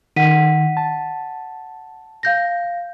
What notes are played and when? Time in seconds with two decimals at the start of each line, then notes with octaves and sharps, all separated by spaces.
0.16 D#3 F#5 B6 D#7
0.77 A5
2.23 F5 G6 A#6